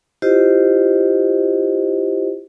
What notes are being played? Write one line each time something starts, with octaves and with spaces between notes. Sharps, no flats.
E4 F4 G4 C5 D#5